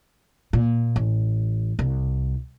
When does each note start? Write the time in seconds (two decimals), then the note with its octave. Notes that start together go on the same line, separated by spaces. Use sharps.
0.53 A#2
0.96 A1
1.79 C2